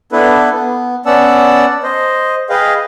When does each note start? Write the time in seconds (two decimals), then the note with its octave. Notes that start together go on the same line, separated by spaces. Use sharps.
0.12 B3 D4 E4 A4 B4
0.51 B3
1.06 B3 C#4 D5 F#5 A5 E6
1.83 C5 D#5
2.50 G#4 B4 D#5 F5 G5